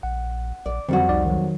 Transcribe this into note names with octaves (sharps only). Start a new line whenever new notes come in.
A#1 F#5
A#1 D5
F2 D3 G3 C4 F#4
C2 D#4 D5
D#3 F#3